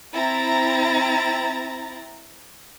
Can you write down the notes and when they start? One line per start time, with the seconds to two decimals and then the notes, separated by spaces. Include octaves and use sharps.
0.14 C4 E4 A#5 A6